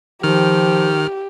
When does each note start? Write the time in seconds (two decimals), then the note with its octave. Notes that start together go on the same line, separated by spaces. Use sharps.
0.23 D#3 F3 G4 F6